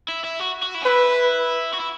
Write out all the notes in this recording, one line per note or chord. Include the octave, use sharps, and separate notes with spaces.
E4
E4
F#4
F#4
E4
C#4
E4 B4
F#4
E4